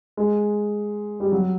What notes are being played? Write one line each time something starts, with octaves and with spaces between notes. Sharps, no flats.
G#3
G3
F#3